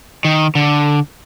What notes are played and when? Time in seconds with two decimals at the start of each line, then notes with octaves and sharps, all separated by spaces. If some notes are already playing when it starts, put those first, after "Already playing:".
0.25 D#3
0.55 D3